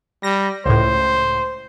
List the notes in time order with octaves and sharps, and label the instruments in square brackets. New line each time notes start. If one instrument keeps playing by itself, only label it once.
[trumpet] G3 [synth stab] A#6
[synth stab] C#2 A2 [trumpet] C5